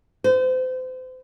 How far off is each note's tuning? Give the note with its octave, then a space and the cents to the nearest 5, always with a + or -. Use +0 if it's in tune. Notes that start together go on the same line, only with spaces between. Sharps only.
C5 -35